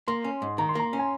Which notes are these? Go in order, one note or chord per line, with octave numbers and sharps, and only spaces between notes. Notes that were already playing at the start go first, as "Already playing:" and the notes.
A#3 C6
C#4
G#2
D#3 A#5
C6
A#3 A#5
C#4
G#5